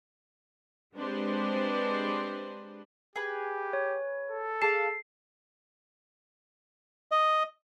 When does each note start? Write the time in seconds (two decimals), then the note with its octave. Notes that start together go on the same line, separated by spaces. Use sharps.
0.96 G#3 C4 D4 G4 B4 C5
3.16 G4 G#4 B4
3.73 C#5
4.31 A4
4.62 G#4 F5 A5 C7 E7
7.11 D#5